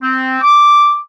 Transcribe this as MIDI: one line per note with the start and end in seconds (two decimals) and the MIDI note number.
0.02 0.38 60
0.42 0.97 86